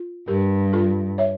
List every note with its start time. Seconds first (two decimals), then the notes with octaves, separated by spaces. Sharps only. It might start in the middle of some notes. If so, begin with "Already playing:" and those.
Already playing: F4
0.28 G2 G4 A#4
0.73 F4 A4
1.18 C#5 E5